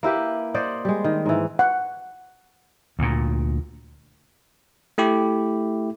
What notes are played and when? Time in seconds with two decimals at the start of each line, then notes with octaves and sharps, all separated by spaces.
0.03 A#3 E4 G4 B4
0.54 C5 D5 D#5 F#5
0.85 G3 G#3
1.04 D#3
1.26 G#2 E3
1.59 F#5
2.99 D2 A#2
4.98 A3 E4 G4